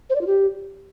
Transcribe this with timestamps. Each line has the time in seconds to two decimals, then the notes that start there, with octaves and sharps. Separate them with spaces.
0.10 C5
0.15 D5
0.21 F4
0.27 G4